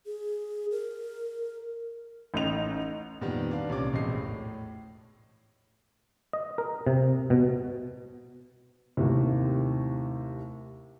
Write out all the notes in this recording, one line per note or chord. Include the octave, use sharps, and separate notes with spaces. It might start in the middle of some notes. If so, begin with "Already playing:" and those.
G#4
A#4
A1 D#4 F7
F2 A#2 D#3 G3 B3
D4 B4 F5
C2 A#2 G3 C#4 D6
E1 A#1 D#5 C7
A2
D#5
A#4
C3
B2
D#2 A2 C3